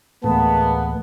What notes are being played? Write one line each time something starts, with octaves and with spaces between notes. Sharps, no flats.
D2 A2 E3 G#3 A#3 B3 A5